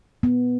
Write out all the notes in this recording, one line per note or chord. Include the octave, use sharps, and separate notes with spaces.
B3